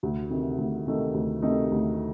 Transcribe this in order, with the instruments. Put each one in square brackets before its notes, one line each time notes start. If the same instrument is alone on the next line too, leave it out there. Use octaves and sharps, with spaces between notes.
[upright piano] D2
C3 D#3 A3 D#4
D2
C3 D#3 A3 D#4
D2
C3 D#3 A3 D#4
D2